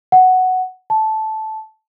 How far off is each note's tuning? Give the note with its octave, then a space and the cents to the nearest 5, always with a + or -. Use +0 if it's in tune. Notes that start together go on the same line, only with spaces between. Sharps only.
F#5 +5
A5 -10